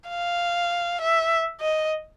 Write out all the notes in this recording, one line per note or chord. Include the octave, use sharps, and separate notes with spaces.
F5
E5
D#5